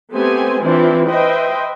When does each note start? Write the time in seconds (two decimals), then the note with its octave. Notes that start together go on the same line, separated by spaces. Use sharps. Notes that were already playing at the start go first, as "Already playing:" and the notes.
0.12 A3 B3 C4 G4 C5 G#5
0.62 E3 C4 D4 E4 F4 C5
1.06 B4 C5 D#5 E5 G5